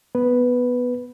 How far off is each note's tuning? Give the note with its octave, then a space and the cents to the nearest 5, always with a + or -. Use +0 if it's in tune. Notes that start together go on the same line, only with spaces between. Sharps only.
B3 +0 B4 +0